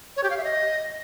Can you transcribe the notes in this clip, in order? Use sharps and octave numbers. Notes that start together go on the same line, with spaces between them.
C#5
G4
F5
E5
D#5